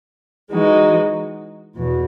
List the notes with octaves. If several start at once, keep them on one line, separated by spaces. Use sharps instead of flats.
E3 G#3 D#4 F#4
E2 B2